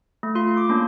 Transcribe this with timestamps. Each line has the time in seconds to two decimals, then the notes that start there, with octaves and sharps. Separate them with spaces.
0.23 A3
0.35 F4 C6
0.57 D6
0.69 A#3 C#4 D4